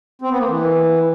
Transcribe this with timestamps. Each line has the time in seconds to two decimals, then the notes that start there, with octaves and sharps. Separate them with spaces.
0.22 C4
0.30 B3
0.39 A#3
0.48 E3